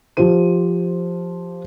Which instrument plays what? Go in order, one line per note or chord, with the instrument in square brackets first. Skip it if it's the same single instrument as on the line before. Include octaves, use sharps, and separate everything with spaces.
[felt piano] F3 F4 G4 C5 D#7